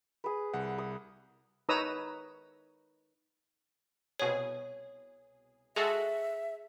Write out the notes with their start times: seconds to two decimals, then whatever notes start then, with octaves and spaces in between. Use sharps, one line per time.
0.24 G#4 B4
0.54 C2 F#5
0.78 D#6
1.69 D#4 B4 C#5 A#5 D#6 E6
4.19 C2 B2 G#4 C#5
5.76 G#3 F#4 G#4 A4 E5